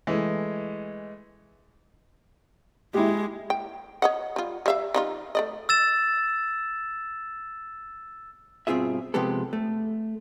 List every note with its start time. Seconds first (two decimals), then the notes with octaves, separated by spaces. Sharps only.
0.07 E3 G#3 A3
2.94 G#3 E4 G4
3.50 G5
4.02 C#5 D#5 F#5
4.36 G3 F4
4.66 G3 E5 F5
4.94 G3 D#4 F4
5.35 A3 D5 D#5
5.69 E6 A6 E7
8.67 G2 B2 C4 F4 G#4 E5
9.14 C3 F3 G#3 B3 G4 A4
9.53 A3